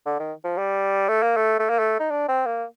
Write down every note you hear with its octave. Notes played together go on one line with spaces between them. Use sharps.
D3
D#3
F3
G3
A3
A#3
A3
A3
A#3
A3
D#4
D4
C4
A#3